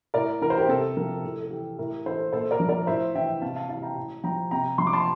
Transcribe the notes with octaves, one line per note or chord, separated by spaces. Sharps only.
A2 A#4 D5
E3 A#4
C5
G4 A#4
C3 A4
F3 G4 A#4
A2 A4
A4
E3 G4
A2 G4 A#4
E3 A4 C5
A#2 A4 C5
A#4 D5
F3
A#4 D5
A2 C5 E5
E3 E5 G5
C3 F5 A5
F5 A5
E3 F5 A5
G5 A#5
A2
F3 G5 A#5
C3 G5 A#5
F3 C6
D6
A5 C6